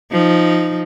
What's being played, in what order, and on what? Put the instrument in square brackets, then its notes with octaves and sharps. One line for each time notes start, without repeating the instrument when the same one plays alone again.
[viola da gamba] F3 D#4